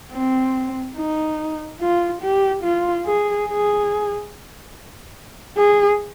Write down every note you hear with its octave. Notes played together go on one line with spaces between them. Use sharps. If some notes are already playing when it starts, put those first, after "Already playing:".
C4
D#4
F4
G4
F4
G#4
G#4
G#4